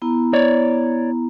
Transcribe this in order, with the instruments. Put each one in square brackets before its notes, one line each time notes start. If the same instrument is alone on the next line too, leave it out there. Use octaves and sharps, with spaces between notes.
[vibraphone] B3 E4 A#5
[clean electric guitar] C#5 D5